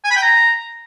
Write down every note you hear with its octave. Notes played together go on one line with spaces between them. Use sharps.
G#5
B5
G5
A#5